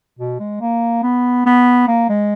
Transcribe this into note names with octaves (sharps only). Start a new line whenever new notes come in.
B2
G#3
A#3
B3
B3
A#3
G#3